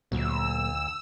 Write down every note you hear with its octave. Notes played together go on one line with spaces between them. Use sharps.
D2 A#2 F#3 E6